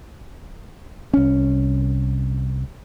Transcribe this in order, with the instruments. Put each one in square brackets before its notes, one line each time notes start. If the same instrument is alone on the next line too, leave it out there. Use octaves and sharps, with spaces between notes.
[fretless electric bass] C2 C#4